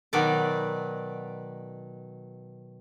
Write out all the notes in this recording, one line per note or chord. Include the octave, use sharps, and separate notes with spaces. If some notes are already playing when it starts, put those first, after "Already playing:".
B2 D#3 F#3 B4 D5